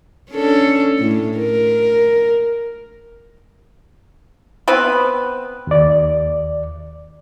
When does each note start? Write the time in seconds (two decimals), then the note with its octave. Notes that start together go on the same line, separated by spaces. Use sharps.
0.31 C#4 D4 A4
0.99 A2
1.38 A#4
4.68 B3 C4 B4
5.67 D#2 D5